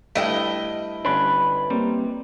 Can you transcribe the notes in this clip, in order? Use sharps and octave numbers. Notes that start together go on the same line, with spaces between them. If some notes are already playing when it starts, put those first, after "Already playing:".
G2 A3 E4 D#5 G5
G1 C#4 D4 B4
G3 A#3 C4